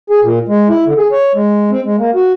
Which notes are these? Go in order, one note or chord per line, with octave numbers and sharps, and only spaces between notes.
G#4
A#2
G#3
E4
D3
G#4
C#5
G#3
C4
G#3
A#3
F#4